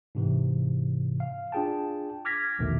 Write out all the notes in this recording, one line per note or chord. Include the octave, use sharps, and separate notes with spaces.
G#2 C3 E3
F5
D4 F4 G#4 G5 A5
D6 F6 G#6 A#6 B6
A#1 E2 B2 D#3 A3